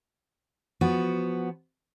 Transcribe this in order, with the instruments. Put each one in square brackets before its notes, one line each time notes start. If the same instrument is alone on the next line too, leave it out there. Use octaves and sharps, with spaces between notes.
[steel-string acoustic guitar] F3 B3 F#4